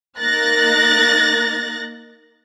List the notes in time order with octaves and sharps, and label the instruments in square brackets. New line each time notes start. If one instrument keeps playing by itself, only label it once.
[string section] A#3 D#4 A#4 F#6 A6 A#6